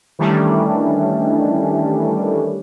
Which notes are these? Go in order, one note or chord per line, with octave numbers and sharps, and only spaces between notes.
D#3 E3 G3 A3 C#4 D4